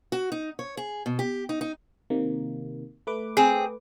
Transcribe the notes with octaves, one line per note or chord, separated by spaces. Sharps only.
F#4
D#4
C#5
G#4
B2
G4
D#4
D#4
C3 D#3 A#3
A3 B4 D6
C4 G#4